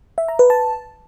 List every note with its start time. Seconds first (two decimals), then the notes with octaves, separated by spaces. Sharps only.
0.18 E5
0.29 A#5
0.39 B4
0.50 A5